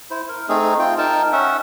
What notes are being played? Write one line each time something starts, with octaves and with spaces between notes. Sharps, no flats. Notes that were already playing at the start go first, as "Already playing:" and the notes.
E4 C5
A#4
A3 C4 D#4 G#4
F4 G5
D#4 A#4 G5 A5
C#4 E5 F#5